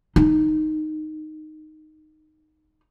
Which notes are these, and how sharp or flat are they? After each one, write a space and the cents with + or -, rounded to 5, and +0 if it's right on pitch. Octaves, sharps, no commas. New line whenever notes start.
D#4 -5